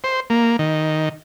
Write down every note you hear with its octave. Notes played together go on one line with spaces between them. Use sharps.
C5
A#3
D#3